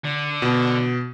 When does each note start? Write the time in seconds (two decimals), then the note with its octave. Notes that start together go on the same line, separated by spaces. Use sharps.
0.04 D3
0.42 B2